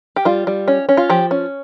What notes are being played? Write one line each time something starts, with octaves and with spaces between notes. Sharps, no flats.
G4
G3 F4
G3
C#4
C#4
F4
F3 G4
C#4